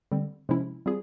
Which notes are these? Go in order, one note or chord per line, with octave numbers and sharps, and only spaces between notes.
D3 G3 C4
C3 F3 G#3 C#4 E4
G3 C4 F4 G#4